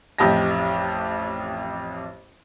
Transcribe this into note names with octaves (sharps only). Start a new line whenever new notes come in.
A1 F2 G4 D#5 A5 A#6